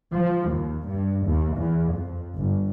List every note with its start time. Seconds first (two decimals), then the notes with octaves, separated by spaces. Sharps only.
0.13 F3
0.49 D#2
0.88 G2
1.26 D#2
1.57 E2
1.93 F2
2.37 G1